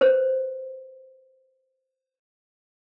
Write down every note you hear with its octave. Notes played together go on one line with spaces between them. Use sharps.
B4 C5